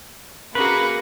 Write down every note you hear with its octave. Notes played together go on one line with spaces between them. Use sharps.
A#3 C#4 F#4 G#4 B4